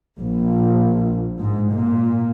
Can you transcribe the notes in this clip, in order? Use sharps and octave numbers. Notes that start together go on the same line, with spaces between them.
A#1
G#2
A#2